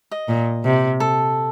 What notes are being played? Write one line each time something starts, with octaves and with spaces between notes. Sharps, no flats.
D#5
A#2
C3
A4